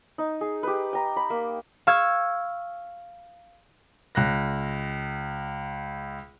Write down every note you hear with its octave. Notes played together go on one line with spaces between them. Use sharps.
D#4
G#4
G4 B4
G5 A#5
B5
A#3
F5 C#6 E6 G#6
C#2 F#6 A#6